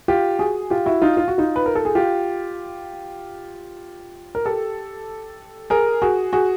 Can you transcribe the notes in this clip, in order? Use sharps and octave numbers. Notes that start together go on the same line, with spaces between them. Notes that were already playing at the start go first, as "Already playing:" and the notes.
F4 G4
F#4 G#4
F4 G4
E4 F#4
D#4 F4
F4
F#4
D#4 F4
B4
A#4
A4
G#4
F4 G4
A#4
G4 A4
G#4 A#4
F#4 G#4
F#4 G#4